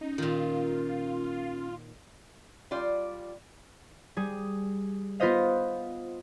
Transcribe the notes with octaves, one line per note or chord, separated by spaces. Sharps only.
C#4 D#4
A#2 D#3 F4
G3 F4 D5
G3 G#4
B3 F4 B4 C5 D#5 F5